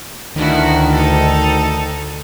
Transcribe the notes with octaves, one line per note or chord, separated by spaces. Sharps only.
D2 D#3 D4 E4 F#4
D#4 A4